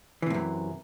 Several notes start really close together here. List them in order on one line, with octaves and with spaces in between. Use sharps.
E3 C3 A2 F#2